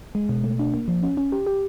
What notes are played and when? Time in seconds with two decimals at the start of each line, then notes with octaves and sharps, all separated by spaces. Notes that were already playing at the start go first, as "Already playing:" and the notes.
0.15 G#3
0.29 B2
0.44 A3
0.59 D4
0.74 A#3
0.88 F3
1.03 C#4
1.17 C#4
1.32 G4
1.47 G4